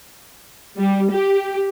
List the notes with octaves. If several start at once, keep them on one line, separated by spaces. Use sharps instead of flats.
G3
G4